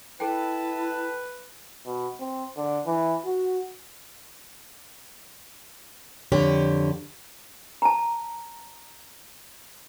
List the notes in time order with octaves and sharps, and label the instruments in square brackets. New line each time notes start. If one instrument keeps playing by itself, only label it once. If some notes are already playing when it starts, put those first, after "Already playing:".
[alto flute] E4 [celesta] A4 G5 [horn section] B4 [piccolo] A5
[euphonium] B2
C4
D3
E3
F#4
[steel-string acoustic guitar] F2 D3 G4 C#5
[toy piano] A5 A#5